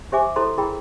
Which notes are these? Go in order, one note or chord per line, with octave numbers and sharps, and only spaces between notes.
G4 C5 E5 G#5 D6
E4 A4 C5 A#5 C6
E4 G#4 A#4 G5 A#5 B5